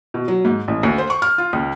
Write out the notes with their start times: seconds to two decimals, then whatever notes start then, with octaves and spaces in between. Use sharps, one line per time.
0.14 B2
0.28 F#3
0.45 G#2
0.68 A1
0.83 D2
0.98 C5
1.10 C#6
1.22 F6
1.38 F4
1.53 C#2